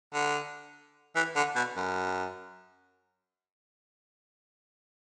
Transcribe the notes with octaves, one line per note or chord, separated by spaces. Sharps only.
D3
E3
D3
B2
F#2